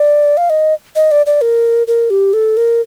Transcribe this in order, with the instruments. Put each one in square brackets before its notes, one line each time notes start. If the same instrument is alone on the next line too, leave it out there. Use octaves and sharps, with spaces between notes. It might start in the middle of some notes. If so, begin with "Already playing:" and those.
Already playing: [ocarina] D5
F5
D#5
D#5
D5
D5
A#4
A#4
G4
A4
A#4